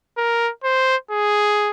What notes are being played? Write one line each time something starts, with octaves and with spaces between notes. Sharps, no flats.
A#4
C5
G#4